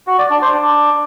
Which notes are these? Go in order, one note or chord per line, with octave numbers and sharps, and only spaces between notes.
F#4
D5
D4
C5
D4